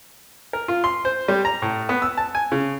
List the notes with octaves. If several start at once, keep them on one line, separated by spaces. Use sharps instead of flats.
A#4
F4
C6
C5
G3
A#5
A2
B3
E6
A5
G#5
C#3